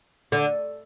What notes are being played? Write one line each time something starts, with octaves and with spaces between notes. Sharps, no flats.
D3